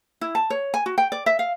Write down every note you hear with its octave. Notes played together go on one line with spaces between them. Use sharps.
E4
A5
C#5
G#5
F#4
G5
D5
E5
F5